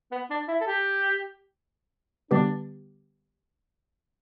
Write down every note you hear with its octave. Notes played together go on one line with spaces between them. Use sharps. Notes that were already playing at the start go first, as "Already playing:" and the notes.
B3
D4
E4
A4
G4
D3 G3 B3 D4 G4 B4